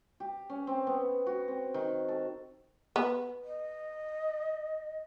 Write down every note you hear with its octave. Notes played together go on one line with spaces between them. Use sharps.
G4
C#4
C4
B3
F#4
C4
D#3
A4
B3
D#5